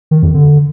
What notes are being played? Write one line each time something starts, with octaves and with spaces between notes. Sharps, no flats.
D#3
F2
D3